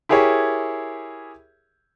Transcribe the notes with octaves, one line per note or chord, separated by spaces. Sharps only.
E4 G4 G#4 A#4 C#5 E5